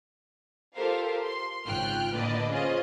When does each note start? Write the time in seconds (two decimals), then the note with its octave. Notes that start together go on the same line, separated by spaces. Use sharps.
0.75 F4 G4 A4 A#4 C5 F5
1.24 C6
1.66 G#1 C#3 F4 G5 F6 F#6
2.13 A2 D3 A#3 B4 D5 D#5
2.50 C#4 F4 G#4 C5 D#5 F5